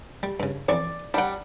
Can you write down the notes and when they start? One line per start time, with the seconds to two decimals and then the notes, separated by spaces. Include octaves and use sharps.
0.23 G3
0.40 G2 C#3
0.69 F2 E3 D5 C#6
1.14 G3 D4 F#5 G5